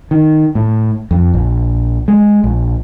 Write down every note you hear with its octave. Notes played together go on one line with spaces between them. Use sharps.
D#3
A2
F2
A#1
G#3
A#1